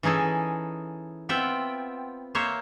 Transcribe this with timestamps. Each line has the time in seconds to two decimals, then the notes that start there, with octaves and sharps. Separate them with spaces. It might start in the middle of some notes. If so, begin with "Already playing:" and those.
0.03 E3 C#4 D#4 G#4 A4
1.29 B3 C4 F4 E5 F#5 G5
2.35 A#3 C5 C#5 E5